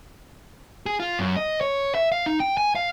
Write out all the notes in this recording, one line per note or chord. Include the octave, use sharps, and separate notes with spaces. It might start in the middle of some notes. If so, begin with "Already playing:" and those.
G#4
F4
F#2
D#5
C#5
E5
F5
D#4
G5
G#5
F5